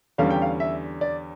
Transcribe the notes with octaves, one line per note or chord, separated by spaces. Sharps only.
E2 D3 G3 C#4 F5
G5
F5
E5
D5